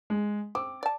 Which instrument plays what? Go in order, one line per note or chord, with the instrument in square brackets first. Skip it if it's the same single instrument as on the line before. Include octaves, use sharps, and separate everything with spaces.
[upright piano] G#3
[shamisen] C4 [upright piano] D6
[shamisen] D5 A5